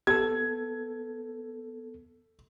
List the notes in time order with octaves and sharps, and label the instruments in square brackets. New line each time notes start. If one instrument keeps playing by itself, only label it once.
[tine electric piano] B3 A4 [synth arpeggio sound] G4 [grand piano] G#6